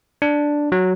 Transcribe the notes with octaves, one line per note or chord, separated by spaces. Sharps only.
D4
F#3